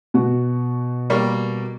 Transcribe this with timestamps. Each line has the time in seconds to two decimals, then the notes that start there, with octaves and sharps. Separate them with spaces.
0.14 B2 F#4
1.10 G3 A#3 C#6